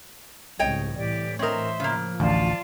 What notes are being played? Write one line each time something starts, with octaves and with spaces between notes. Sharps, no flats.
C2 G#2 C#3 C#5 D#5 G5
A2 E3 G4 D5
C4 A#4 C5 C#5 D#5 E5
C#3 F3 A#3
A1 D2 F4 D5 A5